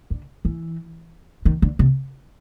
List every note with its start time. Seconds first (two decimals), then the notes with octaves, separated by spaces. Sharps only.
0.10 D3
0.45 E3
1.45 D#3
1.62 D3
1.79 C3